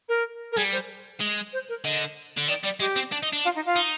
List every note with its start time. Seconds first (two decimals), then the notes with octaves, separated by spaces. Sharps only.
0.08 A#4
0.51 A#4
0.56 G3 G#4
0.72 C5
1.20 G#3
1.53 C5
1.68 A#4
1.84 D3 D#5
2.38 D3
2.48 D#3 D5
2.64 G3 D5
2.80 G#3 G4
2.96 C4
3.12 D4
3.23 D#4
3.33 D4
3.44 F4
3.55 D#4
3.65 F4
3.76 D#4